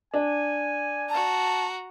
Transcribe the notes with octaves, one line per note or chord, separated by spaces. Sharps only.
D4 G#5
F#4 A5 A#5